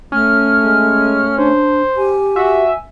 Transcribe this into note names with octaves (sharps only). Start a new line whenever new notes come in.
A3 C#4 F6
G#3
D4 C5
G4 G#5
F#4 E5